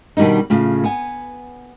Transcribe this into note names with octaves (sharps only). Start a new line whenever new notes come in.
B2 D#3 G3 D4 D#4
A2 C#3 F4
B3 G#5